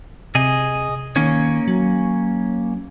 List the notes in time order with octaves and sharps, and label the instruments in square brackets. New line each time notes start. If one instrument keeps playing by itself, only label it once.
[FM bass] C3 [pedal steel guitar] G#4 D#5 G#5
[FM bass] D#3 [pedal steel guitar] A#3 C#4 C#5
[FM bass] F#3